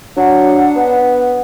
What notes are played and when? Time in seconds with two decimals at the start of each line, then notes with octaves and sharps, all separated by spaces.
0.17 F#3 D4 F#5
0.76 B3